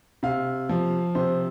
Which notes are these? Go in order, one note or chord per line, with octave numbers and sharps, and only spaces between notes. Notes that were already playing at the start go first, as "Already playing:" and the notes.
C3 F5
F3
C3 C5